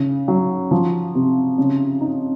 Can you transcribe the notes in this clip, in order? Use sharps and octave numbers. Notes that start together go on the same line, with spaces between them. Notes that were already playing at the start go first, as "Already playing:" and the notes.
Already playing: C#3
F#3
F3
C3
C#3
D#4